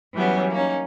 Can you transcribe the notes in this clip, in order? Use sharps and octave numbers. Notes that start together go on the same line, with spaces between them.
E3 F#3 G3 B3 C#4
A#3 C#4 D#4